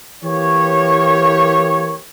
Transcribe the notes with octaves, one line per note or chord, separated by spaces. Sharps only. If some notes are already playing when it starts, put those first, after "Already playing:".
E3 A#3 G4 C#5